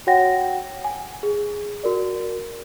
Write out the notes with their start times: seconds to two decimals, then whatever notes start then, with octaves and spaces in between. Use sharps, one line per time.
0.07 F#4 C#5 F#5 G5 A#6
0.84 G#5
1.23 G#4
1.83 F#4 A#4 D5